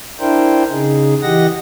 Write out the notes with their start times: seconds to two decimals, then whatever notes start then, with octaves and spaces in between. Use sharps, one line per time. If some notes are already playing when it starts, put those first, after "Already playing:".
0.20 D4 E4 A#4 C5 G5
0.70 C#3 D#4 G#4
1.22 E3 G4 D#5 F#5 A#6